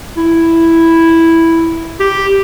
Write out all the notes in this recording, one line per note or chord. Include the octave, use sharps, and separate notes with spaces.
E4
G4